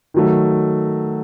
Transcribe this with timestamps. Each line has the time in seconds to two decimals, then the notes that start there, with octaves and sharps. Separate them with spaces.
0.14 D#3 F#3 A3